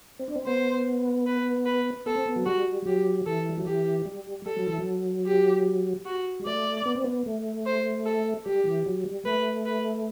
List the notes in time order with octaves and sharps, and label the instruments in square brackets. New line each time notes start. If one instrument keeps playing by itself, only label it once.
[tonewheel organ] C4
D4
C4
[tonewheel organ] B3 [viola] C5
[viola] B4
B4
[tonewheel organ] B3 [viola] A4
[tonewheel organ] C4
B3
F#3
[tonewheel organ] G3 [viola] F#4
[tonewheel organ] F#3 [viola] G4
[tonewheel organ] E3 [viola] A4
[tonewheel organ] G3
F#3
[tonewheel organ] E3 [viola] G4
[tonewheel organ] G3
[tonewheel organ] G3 [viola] A4
[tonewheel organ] F#3
E3
F#3
[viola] G4
F#4
[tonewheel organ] G3
[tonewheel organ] A3 [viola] D5
[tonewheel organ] B3
C4
B3
A3
[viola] C5
A4
[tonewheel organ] G3 [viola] G4
[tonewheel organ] E3
F#3
G3
[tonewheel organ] A3 [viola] B4
[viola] B4